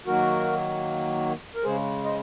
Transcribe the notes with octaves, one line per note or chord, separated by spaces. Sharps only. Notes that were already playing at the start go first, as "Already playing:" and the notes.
D#3 F#3 A#3 F#4 A#4
A#4
C#3 G#3 G#4 C5
C5 D#5